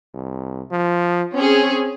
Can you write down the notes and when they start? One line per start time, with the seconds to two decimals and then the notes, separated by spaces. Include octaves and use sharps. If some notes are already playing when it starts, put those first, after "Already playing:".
0.14 C2
0.71 F3
1.34 C4 C#4 G#4